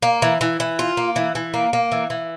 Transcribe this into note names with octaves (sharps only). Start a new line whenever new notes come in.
A#3
E3
E3
E3
F4
A#3
E3
E3
A#3
A#3
E3
E3